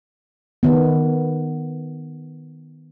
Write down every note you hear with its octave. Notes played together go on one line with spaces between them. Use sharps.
D#3 B3